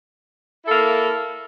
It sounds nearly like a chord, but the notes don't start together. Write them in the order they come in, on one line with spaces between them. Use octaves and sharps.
E4 A4 A#3